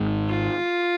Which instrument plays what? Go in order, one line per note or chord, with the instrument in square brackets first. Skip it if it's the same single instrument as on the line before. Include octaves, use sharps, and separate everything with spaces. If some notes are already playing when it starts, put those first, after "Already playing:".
Already playing: [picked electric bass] G#1 G#2
[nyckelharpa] F4